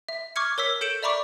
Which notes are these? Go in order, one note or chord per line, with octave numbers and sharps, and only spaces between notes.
E5
C#6 D6 F6 G#6 C#7
A#4 C#5 E6 B6
A4 G6 C#7 D7 E7 F#7
D5 E5 A#5 B5 C#6 D6